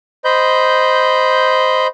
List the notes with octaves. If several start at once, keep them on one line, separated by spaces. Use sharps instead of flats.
C5 D#5 B5 G6